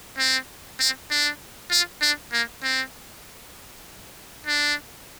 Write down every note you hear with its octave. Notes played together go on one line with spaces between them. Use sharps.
C4
C4
D4
F4
D4
A#3
C4
D4